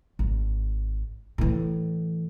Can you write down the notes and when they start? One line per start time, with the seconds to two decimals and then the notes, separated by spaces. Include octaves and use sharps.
0.19 G#1
1.38 A2 E3